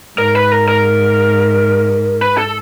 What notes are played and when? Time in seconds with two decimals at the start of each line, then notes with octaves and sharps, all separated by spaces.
0.17 G#2 A#4
0.35 B4
0.52 A#4
0.68 A#4
2.21 B4
2.38 A4